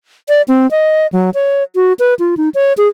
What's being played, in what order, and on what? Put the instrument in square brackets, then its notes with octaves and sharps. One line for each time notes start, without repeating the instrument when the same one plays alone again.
[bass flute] D5
C4
D#5
F#3
C#5
F#4
B4
F4
D#4
C#5
G#4